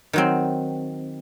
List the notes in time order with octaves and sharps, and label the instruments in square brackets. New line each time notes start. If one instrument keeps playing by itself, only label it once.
[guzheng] D#3 F#3 C4